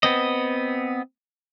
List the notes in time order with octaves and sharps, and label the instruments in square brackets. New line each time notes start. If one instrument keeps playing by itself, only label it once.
[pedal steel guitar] B3 C4 D#5